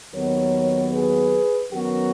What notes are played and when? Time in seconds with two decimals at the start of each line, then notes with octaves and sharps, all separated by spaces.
0.13 D#2 D#3 F#3 B3 A#4 C#5
0.93 G#4 B4
1.71 F#2 D#3 F#3 B3 F#4 A#4